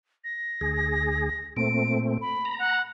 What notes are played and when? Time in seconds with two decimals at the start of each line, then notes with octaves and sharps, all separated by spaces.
0.24 A#6
0.61 D2 G#4
1.57 A#2 A3 C4 D7
2.21 B5
2.45 A#5
2.59 F#5